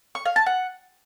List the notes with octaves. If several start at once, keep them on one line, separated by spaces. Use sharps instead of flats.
C#6
F5
A5
F#5